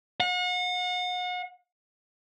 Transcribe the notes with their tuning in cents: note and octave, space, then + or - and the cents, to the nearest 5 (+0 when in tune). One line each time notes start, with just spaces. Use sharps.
F#5 -40